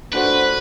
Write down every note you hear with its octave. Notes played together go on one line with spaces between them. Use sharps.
A3 D4 F#4 B4 C5